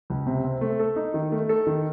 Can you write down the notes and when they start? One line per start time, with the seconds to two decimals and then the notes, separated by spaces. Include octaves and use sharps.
0.10 C#2
0.27 C3
0.44 C4
0.61 A3
0.79 A4
0.96 D#4
1.14 D#3
1.32 A3
1.49 A4
1.67 D#3